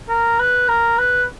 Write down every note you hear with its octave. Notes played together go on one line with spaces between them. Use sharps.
A#4
B4
A#4
B4